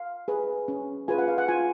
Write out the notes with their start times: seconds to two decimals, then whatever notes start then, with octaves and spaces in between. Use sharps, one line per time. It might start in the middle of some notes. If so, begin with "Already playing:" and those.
Already playing: F5
0.28 G#4 B4
0.68 C#4
1.08 F4 G#4 B4 G#5
1.18 F#5
1.28 F5
1.38 F#5
1.48 F4 G#5